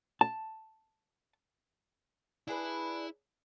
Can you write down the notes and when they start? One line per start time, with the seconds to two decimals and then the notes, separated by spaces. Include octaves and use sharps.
0.21 A5
2.48 D4 E4 G#4 B4